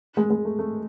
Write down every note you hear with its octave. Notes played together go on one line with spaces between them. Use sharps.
G#3
G#3
A3
A3